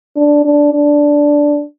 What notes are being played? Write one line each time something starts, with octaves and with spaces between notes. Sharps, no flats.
D4
D4
D4